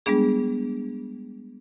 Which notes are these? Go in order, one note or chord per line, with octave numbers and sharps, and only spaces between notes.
G3 G#3 B3 D4 G#4